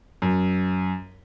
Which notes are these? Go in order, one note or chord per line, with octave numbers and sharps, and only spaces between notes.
F#2